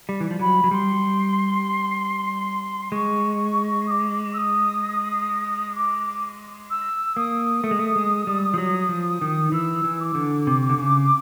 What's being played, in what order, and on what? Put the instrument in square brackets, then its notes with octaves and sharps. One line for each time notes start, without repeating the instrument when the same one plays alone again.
[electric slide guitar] G3
E3
F3
[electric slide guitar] F#3 [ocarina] B5
[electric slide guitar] F#3
[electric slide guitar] G3 [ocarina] C6
[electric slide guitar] G#3 [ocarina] C#6
[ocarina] D#6
D6
E6
D#6
D6
E6
[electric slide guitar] A#3 [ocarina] D#6
[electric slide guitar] A3
G#3
A3
G#3
G3
F3
F#3
F3
D#3
[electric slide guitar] E3 [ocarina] E6
[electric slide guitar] E3
[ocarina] D6
[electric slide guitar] D3
C3
D3
C#3